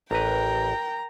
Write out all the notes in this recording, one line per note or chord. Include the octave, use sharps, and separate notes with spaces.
A1 A#4 B4 G5 A#5